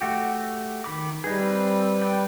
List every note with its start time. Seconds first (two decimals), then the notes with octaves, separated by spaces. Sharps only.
0.01 A3 F#4 G4
0.84 D#3 B5 D6
1.24 G3 D#4 G#4 B4
1.40 C4
2.02 D5 G5